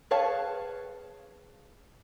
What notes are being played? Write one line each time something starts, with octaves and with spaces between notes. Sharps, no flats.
G#4 B4 C#5 F5 A5